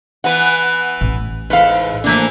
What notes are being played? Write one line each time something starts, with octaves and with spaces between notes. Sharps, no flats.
E3 B3 B4 F#5
A1
E2 G#2 A4 B4 F5
E3 F3 A3 A#3 D4